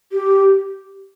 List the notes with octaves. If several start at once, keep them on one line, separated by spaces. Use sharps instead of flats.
G4